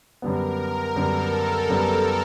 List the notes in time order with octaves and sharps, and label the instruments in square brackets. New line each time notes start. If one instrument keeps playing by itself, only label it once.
[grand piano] F#2 D3 G3 B3 [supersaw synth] A#4
[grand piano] F#2 D3 G3 B3 [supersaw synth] A4
[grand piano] F#2 D3 G3 B3